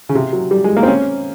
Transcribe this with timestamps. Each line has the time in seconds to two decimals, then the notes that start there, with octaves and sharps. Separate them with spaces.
0.09 C#3
0.15 C3
0.33 F#3
0.51 G3
0.64 G#3
0.77 A#3
0.83 C4
0.88 C#4